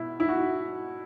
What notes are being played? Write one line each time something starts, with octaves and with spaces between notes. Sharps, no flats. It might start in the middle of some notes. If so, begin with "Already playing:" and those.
Already playing: B2 E4
E4
F#4